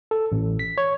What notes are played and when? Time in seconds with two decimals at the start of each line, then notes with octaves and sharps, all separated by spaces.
0.11 A4
0.32 A1
0.59 B6
0.78 C#5